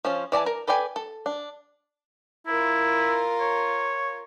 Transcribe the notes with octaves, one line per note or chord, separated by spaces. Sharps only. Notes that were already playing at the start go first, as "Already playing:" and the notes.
F3 C#4 F4
E3 D5 G#5 A5
A#4
A4 B4 D5 G5 G#5
A4
D4
E4 F4 A#4
C#5